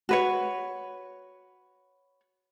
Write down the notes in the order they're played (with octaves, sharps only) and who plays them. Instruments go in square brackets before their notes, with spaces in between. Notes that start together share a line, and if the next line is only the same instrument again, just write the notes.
[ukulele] F#4 B4 C#5